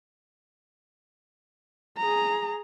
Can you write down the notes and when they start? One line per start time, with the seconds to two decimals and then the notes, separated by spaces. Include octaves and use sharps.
1.97 G#4 A#5